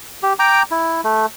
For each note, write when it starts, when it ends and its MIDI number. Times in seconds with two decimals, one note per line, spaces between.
0.23 0.33 67
0.39 0.63 79
0.39 0.63 82
0.39 0.63 86
0.71 1.01 64
1.04 1.26 57